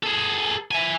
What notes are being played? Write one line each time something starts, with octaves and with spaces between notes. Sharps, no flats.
G#4 A4
E5 G#5